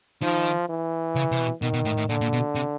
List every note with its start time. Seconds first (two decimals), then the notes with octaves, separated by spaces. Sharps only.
0.22 D#3 F3
0.69 E3
1.15 C#3
1.32 C3
1.39 B2
1.62 B2 D#3
1.73 B2
1.85 A2
1.97 A2
2.09 A#2 D3
2.21 A#2
2.33 B2
2.55 C3